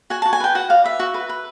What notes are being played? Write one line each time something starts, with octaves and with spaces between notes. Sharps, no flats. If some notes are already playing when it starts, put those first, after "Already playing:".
F#4 G#5
F#4 A5
G#5
B4 G5
F#4 F#5
D5 F5
B4 E5
F#4
B4
B4